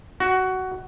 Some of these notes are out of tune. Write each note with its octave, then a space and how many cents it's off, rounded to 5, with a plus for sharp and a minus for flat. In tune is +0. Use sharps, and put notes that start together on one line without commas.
F#4 +15